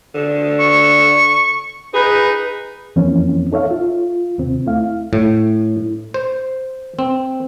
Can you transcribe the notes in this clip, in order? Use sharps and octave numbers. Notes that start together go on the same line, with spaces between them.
D3
C#6
D#4 G#4 B4
F2 E3 F3 A#3 C4 C#4
D#4 A4 C#5 E5 F5
F4
D#2 C3 C4
A3 E4 F5
A2
C5
C4